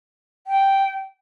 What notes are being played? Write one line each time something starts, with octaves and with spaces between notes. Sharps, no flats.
G5